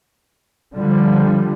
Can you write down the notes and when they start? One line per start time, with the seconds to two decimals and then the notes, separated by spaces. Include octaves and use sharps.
0.74 D3 F3 G3